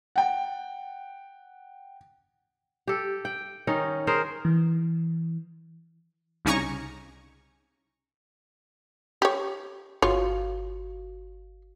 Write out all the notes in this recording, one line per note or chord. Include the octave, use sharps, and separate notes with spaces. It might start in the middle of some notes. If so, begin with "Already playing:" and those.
F#5 G5
G4 A4
G5
D#3 C#4 D#4
G#4 A#4 C5
E3
C2 C#3 D#4 G#5 A#5 C#6
G4 C#5
G1 F4 F#4 C#5 F5